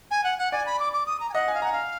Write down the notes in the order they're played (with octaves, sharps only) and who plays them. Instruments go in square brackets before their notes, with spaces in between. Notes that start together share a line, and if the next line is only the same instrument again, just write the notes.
[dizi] G#5
F#5
F#5
[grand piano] D5 [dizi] G#5
[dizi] B5
D6
D6
D#6
A#5
G#5
[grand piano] D#5 [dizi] F#5
[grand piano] G#5
[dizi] F5
[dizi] F#5 [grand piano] A#5
[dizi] F5